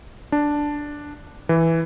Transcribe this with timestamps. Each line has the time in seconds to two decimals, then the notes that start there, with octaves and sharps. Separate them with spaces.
0.32 D4
1.49 E3